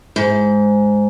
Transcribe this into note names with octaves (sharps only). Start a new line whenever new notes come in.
G#2